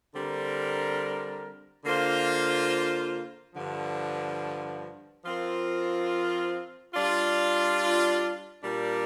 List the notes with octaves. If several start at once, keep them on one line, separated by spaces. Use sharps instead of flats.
D3 G3 C4 A#4
D3 A#3 F4 C5
G2 D3 F3
F3 C4 F4 A#4
G3 D4 F4
A#2 G3 D4 G4 A#4